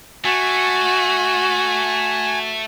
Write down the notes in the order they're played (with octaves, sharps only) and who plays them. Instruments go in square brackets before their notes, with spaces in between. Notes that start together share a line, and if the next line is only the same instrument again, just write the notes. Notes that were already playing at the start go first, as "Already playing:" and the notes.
[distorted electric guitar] A3 [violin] F#4 [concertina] G#5